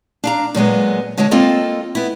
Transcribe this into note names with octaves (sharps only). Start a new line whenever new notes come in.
D4 F5 A#5
A#2 F#3 G#3 B3
D3 G#3 F#4 C#5 A5
A#3 C4 F4 A4 D#5
B3 E4